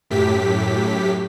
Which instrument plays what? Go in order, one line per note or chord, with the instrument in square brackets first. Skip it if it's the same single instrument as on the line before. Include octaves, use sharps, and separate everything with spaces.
[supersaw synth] F#2 A2 G4 B6